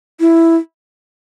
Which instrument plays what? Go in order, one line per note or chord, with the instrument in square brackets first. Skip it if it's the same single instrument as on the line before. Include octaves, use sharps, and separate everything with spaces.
[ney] E4